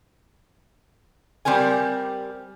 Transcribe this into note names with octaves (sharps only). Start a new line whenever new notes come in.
G3 C4 G4 A#4 G#5